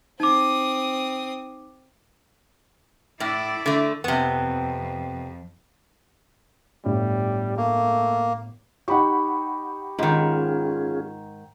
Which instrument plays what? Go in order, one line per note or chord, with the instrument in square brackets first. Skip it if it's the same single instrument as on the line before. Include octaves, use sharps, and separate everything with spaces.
[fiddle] C4 D#6 [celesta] D#4 D6
[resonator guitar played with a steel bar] A2 [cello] E4 D5
[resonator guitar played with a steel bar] D3 A3
[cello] F2 [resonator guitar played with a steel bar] C3 B3
[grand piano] G1 A2 [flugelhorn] G3
[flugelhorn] A3 [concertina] A#3
[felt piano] D#4 G4 [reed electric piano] F#5 B5 C#6
[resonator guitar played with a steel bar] G#2 D#3 [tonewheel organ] C#4 F4 G#4